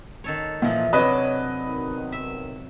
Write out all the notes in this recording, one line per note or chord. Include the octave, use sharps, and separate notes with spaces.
D#3 A4 C#5
A#2 E3 F3 A#3 D#5 E5
C3 F#3 D4 B4 C#5 D#5
B1 D#3
E5